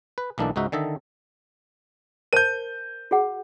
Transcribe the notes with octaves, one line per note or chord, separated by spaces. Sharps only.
B4
B1 E3 A#3 D4 D#4 A4
C#2 G#2 D#4 F#4 E5
D3 D#3 A4 D#5 E5
A#4 C5 A5 G6 D#7
F#4 G#4 F#5